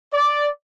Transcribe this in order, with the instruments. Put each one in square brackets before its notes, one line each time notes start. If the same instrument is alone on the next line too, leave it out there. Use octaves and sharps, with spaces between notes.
[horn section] D5